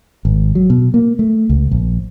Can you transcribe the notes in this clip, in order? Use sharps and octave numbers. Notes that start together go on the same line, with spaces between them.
G#1
F#3
B2
A#3
A3
C#2
A#1